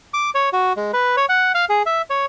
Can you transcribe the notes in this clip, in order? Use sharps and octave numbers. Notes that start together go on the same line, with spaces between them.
D6
C#5
F#4
G#3
B4
C#5
F#5
F5
G#4
E5
C#5